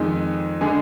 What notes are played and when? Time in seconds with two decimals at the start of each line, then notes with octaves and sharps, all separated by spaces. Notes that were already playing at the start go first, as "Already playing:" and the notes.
Already playing: F2 D#3 G#3 D#4
0.61 D3 G#3 D4 G#4